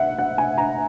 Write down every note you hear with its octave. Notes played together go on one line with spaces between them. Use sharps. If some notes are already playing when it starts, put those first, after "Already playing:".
Already playing: E5 F#5
F#5
G#5
A#5